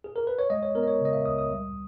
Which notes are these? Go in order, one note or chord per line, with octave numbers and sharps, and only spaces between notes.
G#4
A#4
B4
C#5
G#3 D#5
C#5
B3 A#4
D#5
C#5
C#3 D#5
E5
C#2 D#6
D#6
G3